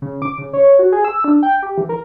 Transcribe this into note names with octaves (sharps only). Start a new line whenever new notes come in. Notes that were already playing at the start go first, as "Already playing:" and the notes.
C#3
D6
C#3
C#5
F#4
G#4
E6
D4
G5
G4
E3
A#4